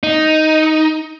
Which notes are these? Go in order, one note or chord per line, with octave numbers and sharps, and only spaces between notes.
D#4